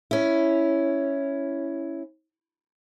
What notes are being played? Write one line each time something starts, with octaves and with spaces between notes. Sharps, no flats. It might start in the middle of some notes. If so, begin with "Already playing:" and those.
C#4 E4